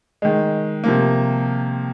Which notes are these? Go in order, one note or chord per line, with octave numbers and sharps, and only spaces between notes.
D#3 G#3
C3 F3 A#3